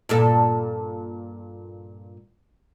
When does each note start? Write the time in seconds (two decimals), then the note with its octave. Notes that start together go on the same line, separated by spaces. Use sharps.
0.09 G2 A#2 A4